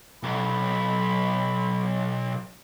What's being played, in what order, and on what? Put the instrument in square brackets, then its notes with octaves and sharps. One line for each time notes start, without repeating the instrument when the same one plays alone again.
[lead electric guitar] B1 [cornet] B5